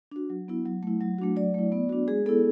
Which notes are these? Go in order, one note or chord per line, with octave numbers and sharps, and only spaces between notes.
D4 F#4
F#3
B3 E4
F#3
A3 E4
F#3
A3 D4 F#4
F#3 D5
A3 E4
B3
D4 F#4
G#3 G#4
B3 E4 A4